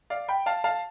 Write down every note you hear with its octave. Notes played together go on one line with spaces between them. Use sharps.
D5 F5
G5 B5
F5 A5
F5 A5